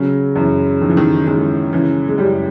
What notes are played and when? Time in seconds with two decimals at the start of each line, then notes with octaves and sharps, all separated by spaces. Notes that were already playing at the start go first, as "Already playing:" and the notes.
Already playing: C#3 F#3
0.35 F#2 E3
0.81 D#3 F3
0.90 E3
0.97 D#3
1.27 D#3 G#3
1.73 C#3 E3
2.08 G#3
2.18 F#2 G3